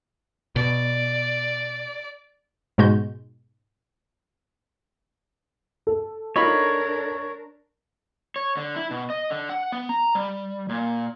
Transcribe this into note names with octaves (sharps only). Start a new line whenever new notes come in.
B2 D5
G#2 B2 G#3 F#4 G6
A4
D4 D#4 F4 A#4 C#5 B5
C#5
D3
E4
B2
D#5
D3
F#5
B3
A#5
G3
A#2